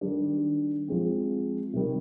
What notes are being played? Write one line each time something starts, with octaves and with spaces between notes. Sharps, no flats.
D#3 G3 D4
F3 G#3 C4
C3 D#3 G3